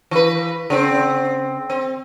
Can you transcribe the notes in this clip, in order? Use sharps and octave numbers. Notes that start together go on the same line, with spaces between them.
E3 B4
C#3 C4
C4